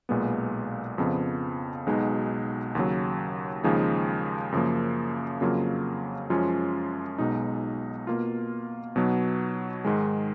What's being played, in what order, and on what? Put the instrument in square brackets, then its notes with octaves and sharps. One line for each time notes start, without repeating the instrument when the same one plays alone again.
[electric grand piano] B1 A#2 G#3 B3
F2 C#3 F3 B3
B1 B2 G#3 D#4 F#4
D#2 C#3 F#3
D#2 C#3 F3 G#3 D#4
F#2 C#3 F3 A#3
F2 C#3 F#3 A#3 F4
F#2 F3 G#3 C#4 F4
B1 B2 G#3 D#4
B2 A#3 F4
B2 F#3 B3 D#4
G#2 D#3 G#3